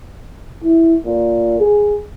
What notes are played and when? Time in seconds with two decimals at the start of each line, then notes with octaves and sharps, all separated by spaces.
0.64 E4
1.06 A#2
1.60 G#4